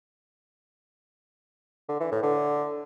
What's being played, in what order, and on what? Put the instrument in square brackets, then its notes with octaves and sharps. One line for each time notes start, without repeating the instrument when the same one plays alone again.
[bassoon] D3
E3
A2
D3